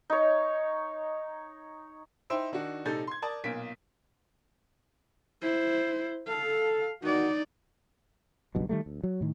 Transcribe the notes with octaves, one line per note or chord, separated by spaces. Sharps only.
D#4 C#5
D#4 E4 C5 G5 E6
D#3 D4 D#4 F#4
A#1 C3 D#4 A4 G6 A6
C6 G#6
A#4 D5 A5 D#6
B1 A#2 A#4 B6 D7
E4 C5
A4 F5
E2 D#3 D#4 F#4 D5
F#1 B1 G2 B2
D#3 G3 A3
D2
F#3
A2 D#3